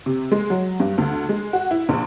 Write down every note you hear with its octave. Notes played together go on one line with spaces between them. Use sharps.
C3
G#3
F#3
G2
D2
G#3
F#4
E4
A#1